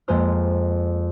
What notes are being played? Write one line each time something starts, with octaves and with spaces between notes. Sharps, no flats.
F2 G#3 A#3 A#4 C5 F6